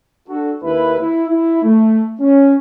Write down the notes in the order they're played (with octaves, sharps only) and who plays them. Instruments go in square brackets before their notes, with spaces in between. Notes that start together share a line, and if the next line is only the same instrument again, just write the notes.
[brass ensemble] D4 F#4 A4
D#2 A#3 E4 B4
E4
E4
A3
C#4